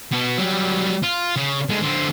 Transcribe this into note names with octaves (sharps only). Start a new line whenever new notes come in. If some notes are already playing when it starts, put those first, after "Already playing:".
B2 B3
F#3 G3
F4
C#3
D3 G#3
D3 C4